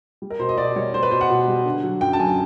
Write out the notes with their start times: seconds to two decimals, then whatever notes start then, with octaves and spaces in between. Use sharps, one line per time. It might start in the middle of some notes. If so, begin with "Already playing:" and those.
0.22 G3
0.30 A#4
0.39 B2 C5
0.49 D#5
0.58 B2 D5
0.76 G3 C#5
0.94 G3 C5
1.03 B4
1.11 B2 C5
1.21 F#5
1.30 B2
1.48 G3
1.65 D3
1.83 F#3
2.01 F#2 G5
2.13 A5
2.19 F#2 G#5